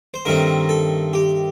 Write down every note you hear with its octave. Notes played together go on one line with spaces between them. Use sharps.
C5
G2 D#3 A3 C4 A#4
A4
G4